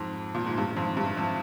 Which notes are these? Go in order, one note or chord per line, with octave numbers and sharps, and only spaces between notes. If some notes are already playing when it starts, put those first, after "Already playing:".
Already playing: F2 G#2
A#2
G#2
G2
F2 G#2
G2
F2